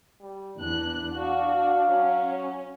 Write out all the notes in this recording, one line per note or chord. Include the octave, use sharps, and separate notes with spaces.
G3
E2 D4 F#6
F#4 F5
F#3 C#4